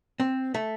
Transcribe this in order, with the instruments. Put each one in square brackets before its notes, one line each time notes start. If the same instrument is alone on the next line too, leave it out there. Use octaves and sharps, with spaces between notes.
[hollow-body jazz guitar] C4
A3